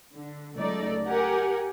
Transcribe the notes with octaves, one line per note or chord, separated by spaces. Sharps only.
D3
C#2 F#3 A3 D#4 D5
G4 A#4 F#5 G#5